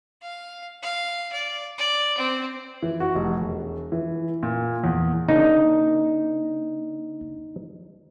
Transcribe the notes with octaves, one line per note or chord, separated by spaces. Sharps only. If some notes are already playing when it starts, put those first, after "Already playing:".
F5
F5
D5
D5
C4
E3
F#4
F1
E1
E3
A#2
E2
C#3 A#3 D4 D#4